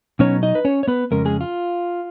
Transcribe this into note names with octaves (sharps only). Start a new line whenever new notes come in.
B2 F#3 B3 C#4 D#4 C#5
D#4 D#5
B4
C#4 C#5
C#5
B3 B4
F2 C#3 G#3 C#4 A#4
G#3 G#4
F4